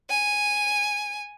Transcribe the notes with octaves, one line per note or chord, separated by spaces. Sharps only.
G#5